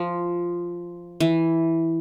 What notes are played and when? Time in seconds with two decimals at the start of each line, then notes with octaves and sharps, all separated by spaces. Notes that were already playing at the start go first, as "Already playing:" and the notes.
Already playing: F3
1.20 E3